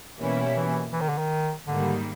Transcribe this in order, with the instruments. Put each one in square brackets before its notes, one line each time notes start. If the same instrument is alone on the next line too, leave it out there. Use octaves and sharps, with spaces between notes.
[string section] B2 G3 A#3 C#4 E4 [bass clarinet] E3
[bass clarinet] E3
E3
D#3
D3
D#3
[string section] G#2 D#3 G3 A#3 [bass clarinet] D3